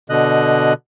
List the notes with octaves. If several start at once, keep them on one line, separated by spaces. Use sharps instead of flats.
B2 D3 D#5 F#6